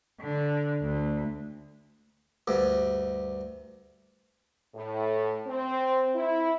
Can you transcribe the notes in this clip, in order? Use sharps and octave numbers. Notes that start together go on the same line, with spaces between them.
D3
D2
D2 G2
A2
C4
E4